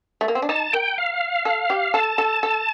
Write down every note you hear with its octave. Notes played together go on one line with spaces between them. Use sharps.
A3
A#3
C4
D4
D#4 A5
A#4 G5
F5
A4
G4
A4 A5
A4
A4